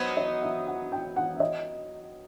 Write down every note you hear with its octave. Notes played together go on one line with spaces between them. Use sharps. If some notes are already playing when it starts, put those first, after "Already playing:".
Already playing: F#3 B3 D#4 C5
D#5
E5
F#5
G5
F#5
E5
D#5